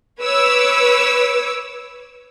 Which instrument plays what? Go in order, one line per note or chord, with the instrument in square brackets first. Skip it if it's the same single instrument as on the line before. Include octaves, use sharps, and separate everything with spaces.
[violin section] B4 C#5 D6 E6